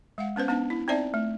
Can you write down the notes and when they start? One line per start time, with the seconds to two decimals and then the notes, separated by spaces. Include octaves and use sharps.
0.18 G#3 F5 F#5
0.36 B3 C#4 B4 C5
0.48 B3 D4 D#4 A5
0.70 E4
0.88 C4 D#4 C5 D5 E5 A5
1.14 A3